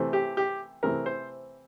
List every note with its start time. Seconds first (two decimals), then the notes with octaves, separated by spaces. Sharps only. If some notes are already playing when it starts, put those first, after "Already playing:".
Already playing: C3 E3 A3 C4
0.13 G4
0.37 G4
0.83 C3 E3 A3 C4 A#4
1.06 C5